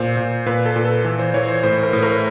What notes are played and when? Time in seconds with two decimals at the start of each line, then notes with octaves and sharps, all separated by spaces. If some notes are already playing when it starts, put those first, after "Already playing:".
Already playing: A#2 C5
0.17 A#2
0.46 A#2 B4
0.66 A4
0.76 A#2
0.85 A4
1.05 E3
1.19 C5
1.34 E3 C#5
1.48 C5
1.63 A2 C5
1.83 A#4
1.93 A2
2.03 A#4